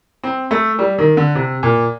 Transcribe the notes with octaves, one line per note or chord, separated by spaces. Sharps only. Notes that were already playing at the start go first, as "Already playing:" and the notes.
C4
A3
G3
D#3
D3
C3
A#2